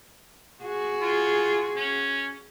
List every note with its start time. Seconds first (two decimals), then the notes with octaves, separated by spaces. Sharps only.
0.64 F#4 G#4
1.02 F4
1.76 C#4